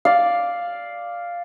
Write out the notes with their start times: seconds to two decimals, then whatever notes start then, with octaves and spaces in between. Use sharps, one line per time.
0.05 D5 F5